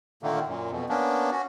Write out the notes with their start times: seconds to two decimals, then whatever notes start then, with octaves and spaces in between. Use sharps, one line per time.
0.23 A#2 D3 D#3 A3 A#3
0.47 F#2 A#2
0.71 F2 B2
0.89 A#3 B3 C#4 D4
1.32 C#4 F#4